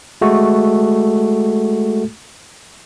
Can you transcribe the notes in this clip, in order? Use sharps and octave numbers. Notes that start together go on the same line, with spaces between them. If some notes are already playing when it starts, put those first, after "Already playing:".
G#3 A3 F#4 A4